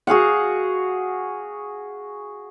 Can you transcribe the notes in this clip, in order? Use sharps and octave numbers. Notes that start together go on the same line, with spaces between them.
F#4 G#4 F5 F#5